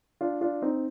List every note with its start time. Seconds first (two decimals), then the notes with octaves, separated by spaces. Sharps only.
0.21 D4 F4
0.41 D4 F4
0.62 C4 D#4